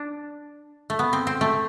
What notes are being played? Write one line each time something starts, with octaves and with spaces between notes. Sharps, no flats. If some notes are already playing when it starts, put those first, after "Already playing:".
Already playing: D4
A3
B3
C4
C4
A3